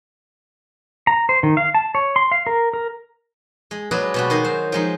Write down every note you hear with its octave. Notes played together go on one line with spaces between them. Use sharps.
A#5
C5
D#3
F5
A5
C#5
C6
F5
A#4
A#4
G#3
F#3 G#3 D4 B4 D5 D#5
B2 G3 F#4
D#3 G#3 D#5 C6
F#3 C5
F3 G#3 D#4